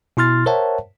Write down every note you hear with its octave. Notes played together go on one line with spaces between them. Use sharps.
B2 E4 C6 F6 A6
A#4 C5 C#5 E5 F#5 A5